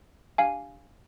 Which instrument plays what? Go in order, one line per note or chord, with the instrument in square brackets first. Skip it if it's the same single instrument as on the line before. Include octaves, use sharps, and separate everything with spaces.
[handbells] D4 G4 F5 G#5